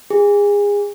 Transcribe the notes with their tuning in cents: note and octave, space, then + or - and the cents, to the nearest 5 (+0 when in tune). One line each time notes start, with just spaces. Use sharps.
G#4 -25